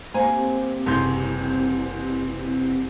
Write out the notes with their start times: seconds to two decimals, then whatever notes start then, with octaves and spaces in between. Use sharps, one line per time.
0.14 A#3 C4 G4 C5 G#5 A#5
0.86 F#1 C2 C3 E3 G3 C6 G6 A#6